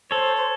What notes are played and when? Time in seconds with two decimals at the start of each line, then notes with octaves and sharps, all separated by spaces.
0.11 A4 C5 C#5
0.36 C5